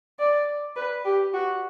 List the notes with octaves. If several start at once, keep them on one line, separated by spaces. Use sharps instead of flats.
D5
B4
G4
F#4